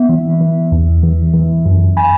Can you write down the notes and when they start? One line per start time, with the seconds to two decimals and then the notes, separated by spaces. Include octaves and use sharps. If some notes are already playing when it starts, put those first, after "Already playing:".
Already playing: B3 E5
0.09 E3
0.40 E3
0.72 E2
1.03 E3
1.34 E3
1.66 F#2
1.97 G#5 B5